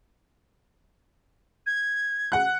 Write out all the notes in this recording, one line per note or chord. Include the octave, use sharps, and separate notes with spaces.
G#6
F#5 F#6